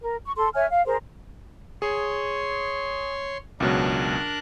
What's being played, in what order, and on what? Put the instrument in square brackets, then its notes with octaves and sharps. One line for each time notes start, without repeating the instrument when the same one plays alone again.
[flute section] A#4
C#6
A4 C6
C#5 E5 G#5 F6
F5
G#4 A#4 C5
[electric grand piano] G#4 [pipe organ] C#5 C6
[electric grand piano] C#2 B2 F#3 [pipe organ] D4 A#4 F#6